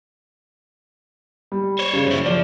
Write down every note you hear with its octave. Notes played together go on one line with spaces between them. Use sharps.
G3
C5 C#5
C#3
F#2 E4
F3 D5